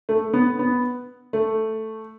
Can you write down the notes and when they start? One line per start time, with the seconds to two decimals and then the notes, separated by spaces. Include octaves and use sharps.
0.09 A3
0.34 B3
0.59 B3
1.33 A3